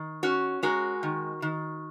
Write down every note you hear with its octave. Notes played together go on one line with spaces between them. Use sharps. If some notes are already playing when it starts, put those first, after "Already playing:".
Already playing: D#3
C#4 F#4
G#3 F#4 A#4
D#3
D#3